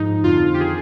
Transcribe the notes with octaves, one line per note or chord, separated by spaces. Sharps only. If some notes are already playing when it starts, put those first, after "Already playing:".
Already playing: G#2 F3 D#4
F2 D3 F3 F4
G4
D#3 G#4